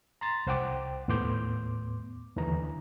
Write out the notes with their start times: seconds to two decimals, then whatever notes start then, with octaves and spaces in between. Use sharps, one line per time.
0.21 A#5 C6 A6
0.47 C2 C5 F#5 G5 D6
1.08 D#2 A2 B3 C6 D6 G6
2.36 D#2 D3 E3 A#5